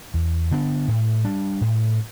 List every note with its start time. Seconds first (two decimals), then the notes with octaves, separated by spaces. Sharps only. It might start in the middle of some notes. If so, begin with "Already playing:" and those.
0.14 E2
0.51 D3 B3 D4
0.88 A2
1.24 G3 D4
1.61 A2